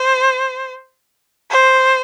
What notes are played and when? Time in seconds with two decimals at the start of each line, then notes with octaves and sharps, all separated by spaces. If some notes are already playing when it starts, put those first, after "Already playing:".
Already playing: C5
1.51 C5